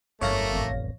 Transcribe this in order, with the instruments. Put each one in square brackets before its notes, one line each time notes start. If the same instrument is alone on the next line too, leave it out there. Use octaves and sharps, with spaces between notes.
[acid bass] G1 [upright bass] F2 F#3 [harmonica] A3 A#3 [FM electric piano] C#5 F5 A#6
[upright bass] A1 F2